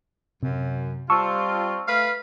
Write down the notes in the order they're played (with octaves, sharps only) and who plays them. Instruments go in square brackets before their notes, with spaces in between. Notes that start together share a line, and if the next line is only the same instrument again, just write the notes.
[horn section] F#2 [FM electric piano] C3
[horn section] G3 C4 F4 [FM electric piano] A5 C#6 E6
[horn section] A3 B4 F5